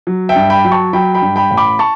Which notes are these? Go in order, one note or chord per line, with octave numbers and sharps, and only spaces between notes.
F#3
E5 G5
G2
G5 B5
F#3
A5 C#6
F#3 G5 B5
G5 B5
G2
G5 B5
A1
B5 D6
A5 C#6